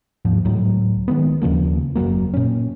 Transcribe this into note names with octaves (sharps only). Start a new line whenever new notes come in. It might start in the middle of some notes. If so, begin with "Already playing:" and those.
D#2 G#2 F3
C#2 A2 F#3
D#3 G#3 B3
D#2 C#3 F3 A#3
F#1 E2 F#3 A#3
A#2 C#4